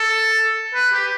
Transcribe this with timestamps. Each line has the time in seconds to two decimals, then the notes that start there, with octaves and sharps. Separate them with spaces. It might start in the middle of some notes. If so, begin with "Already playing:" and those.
Already playing: A4
0.74 B4
0.93 G4